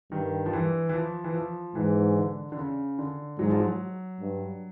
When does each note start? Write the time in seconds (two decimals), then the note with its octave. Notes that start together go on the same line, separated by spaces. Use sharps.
0.12 G2 D#3
0.46 F3
0.53 E3
0.89 E3
0.94 F3
1.24 E3
1.34 F3
1.75 G#2 E3
2.16 D3
2.52 D3
2.57 C#3
2.98 D3
3.39 G#2 F#3
3.50 F3
3.60 F#3
4.21 G2